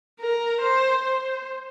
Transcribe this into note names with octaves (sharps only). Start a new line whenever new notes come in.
A#4
C5
C5